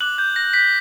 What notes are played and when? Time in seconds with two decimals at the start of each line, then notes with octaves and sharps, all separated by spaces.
0.01 D6 F#6 F#7
0.18 G6
0.36 A#6
0.54 B6